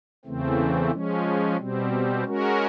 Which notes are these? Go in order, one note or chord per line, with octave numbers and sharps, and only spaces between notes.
E2 C#3 E3 A3 C4
F3 G#3 C#4
B2 G3 C4
G#3 C#4 F#4 A#4